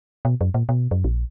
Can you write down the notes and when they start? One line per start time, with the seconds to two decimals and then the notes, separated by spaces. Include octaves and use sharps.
0.25 B2
0.41 F#2
0.54 A#2
0.69 B2
0.91 F#2
1.04 A#1